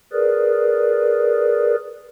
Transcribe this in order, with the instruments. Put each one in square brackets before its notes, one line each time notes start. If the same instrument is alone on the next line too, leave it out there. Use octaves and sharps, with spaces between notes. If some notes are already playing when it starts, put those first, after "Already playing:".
[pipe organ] G#4 A#4 B4 D5